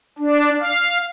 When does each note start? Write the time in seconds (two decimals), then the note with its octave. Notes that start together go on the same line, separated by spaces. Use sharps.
0.18 D4
0.60 F5